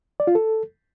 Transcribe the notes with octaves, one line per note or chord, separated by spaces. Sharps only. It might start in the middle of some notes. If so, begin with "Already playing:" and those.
D5
F4
A4